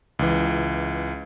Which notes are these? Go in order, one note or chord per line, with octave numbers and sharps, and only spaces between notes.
C#2 E3